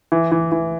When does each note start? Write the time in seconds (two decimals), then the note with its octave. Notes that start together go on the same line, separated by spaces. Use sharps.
0.12 E3
0.32 E3
0.52 E3